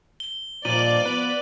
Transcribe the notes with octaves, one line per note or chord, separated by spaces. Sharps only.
G7
G2 A#2 D#3 F3 D5 D#7 F#7
F3 B3 B4